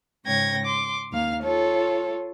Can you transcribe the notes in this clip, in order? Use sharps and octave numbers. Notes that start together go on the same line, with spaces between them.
G#2 C#3 C#5 G5 G#6 A#6
C6 D6
D#2 A#3 F5 F6
F4 A4 C#5